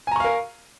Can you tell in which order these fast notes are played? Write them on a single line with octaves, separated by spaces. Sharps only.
G#5 A#5 C#6 F5 A#4